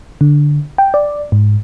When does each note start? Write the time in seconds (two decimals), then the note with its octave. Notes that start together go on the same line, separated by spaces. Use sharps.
0.21 D3
0.78 G5
0.94 D5
1.32 G#2